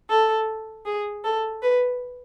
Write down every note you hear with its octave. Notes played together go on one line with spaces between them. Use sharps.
A4
G#4
A4
B4